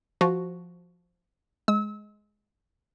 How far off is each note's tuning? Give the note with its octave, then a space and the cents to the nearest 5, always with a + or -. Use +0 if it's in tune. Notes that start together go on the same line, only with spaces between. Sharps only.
F3 +0 F#4 +0
G#3 +10 E6 -35